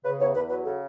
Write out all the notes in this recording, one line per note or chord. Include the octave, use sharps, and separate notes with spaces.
C#3 B4
E2 C#5
E2 B4
F#3 B4
C#3 A4